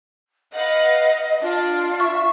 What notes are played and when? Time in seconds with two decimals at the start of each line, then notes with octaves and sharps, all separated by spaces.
0.53 B4 D#5 F5 F#5
1.42 D4 F4
2.00 E5 C#6